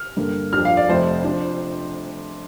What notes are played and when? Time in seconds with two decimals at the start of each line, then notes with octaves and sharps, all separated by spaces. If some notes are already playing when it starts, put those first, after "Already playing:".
Already playing: F6
0.17 G2 D3 A#3
0.53 F2 F3 D4 F6
0.65 F5
0.77 D5
0.89 F1 F2 C3 F3 C5
1.24 F3 D4